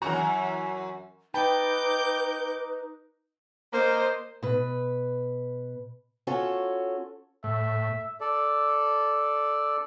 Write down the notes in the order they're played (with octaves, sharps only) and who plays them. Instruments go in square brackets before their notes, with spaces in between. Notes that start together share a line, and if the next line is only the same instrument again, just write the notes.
[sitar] F#2 A#2 F#4 [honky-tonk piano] E3 C#4 A#5
[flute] D#4 [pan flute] B4 [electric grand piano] G5 A5 B5 [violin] D6 G6
[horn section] A#3 [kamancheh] C5 D#5
[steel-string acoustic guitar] B2 B4
C#4 F4 F#4 A4 C#5
[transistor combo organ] A2 [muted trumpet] E5
[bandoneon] A4 D5